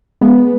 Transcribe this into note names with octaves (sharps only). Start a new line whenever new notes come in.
G#3 B3